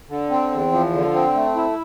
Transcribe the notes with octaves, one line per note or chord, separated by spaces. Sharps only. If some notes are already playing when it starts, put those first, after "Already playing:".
D3
C4
E2
F3
D3
C4
A3
E4